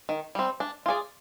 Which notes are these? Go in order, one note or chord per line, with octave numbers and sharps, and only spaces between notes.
D#3
G3 C4
D4
F4 G#4 D5